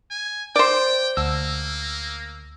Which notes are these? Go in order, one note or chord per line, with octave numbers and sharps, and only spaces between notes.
G#5
C5 D5 G5
D2 A#3 E6